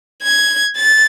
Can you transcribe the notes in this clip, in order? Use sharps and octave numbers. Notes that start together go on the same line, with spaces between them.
G#6
A6